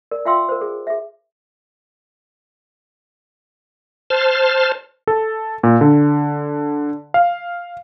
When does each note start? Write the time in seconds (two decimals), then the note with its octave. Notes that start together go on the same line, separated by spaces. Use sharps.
0.11 A#4 D5
0.25 F4 E5 F5 G5 C6 E6
0.49 A#4 C5
0.61 G#4
0.87 G#4 E5
4.10 C5 A5 F6
5.07 A4
5.63 A#2
5.81 D3
7.14 F5